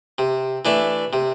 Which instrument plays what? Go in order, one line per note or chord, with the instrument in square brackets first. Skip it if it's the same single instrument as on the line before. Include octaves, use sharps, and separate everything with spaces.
[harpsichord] C3
E3 A3 D4
C3